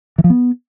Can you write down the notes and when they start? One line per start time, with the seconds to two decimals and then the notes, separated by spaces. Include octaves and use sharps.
0.18 E3
0.24 F3
0.30 B3